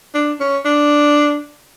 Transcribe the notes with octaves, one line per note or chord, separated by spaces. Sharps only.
D4
C#4
D4